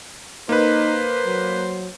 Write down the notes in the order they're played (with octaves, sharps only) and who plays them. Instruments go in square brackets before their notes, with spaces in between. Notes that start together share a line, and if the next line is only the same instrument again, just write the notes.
[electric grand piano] A#3 B4 [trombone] D#4 [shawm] C5
[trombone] F#3